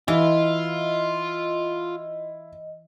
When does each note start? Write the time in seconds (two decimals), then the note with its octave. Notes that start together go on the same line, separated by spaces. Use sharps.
0.08 E3 E4 F4 D#5